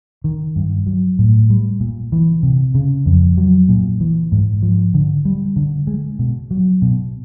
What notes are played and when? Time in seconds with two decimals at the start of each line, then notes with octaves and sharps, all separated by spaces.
0.24 D#3
0.56 G2
0.86 F#3
1.19 A2
1.50 G3
1.80 A#2
2.12 E3
2.43 C3
2.75 C#3
3.06 F2
3.37 F#3
3.69 A#2
4.00 E3
4.32 G#2
4.62 F3
4.94 D3
5.25 G3
5.56 D3
5.87 G#3
6.19 B2
6.51 F#3
6.82 B2